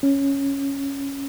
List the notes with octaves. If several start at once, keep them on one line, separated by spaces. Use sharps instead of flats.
C#4